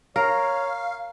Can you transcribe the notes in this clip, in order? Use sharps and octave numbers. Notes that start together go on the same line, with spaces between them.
A#4 C#5 F5